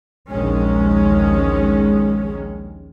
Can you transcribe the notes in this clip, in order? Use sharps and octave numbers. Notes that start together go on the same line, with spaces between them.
A#1 D#2 D#3 G#3 C#4